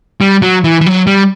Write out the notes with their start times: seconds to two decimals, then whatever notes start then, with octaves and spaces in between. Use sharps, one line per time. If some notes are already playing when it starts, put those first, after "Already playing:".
0.21 G3
0.42 F#3
0.64 E3
0.81 E3
0.86 F#3
1.07 G3